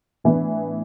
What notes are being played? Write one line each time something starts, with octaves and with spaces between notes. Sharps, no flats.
A2 E3 B3 D4